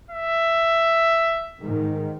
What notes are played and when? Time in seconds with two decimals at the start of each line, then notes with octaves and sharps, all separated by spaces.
0.11 E5
1.61 G#2 D#3